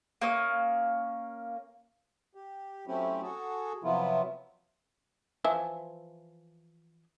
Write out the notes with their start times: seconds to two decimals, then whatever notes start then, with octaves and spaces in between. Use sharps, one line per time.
0.21 A#3 C#4 D#6
2.35 G4
2.87 F#3 A3 C4 C#4 E4 G4
3.22 F#4 G#4 A4
3.84 C3 F3 F#3 B3 E4 F4
5.44 E3 F3 E5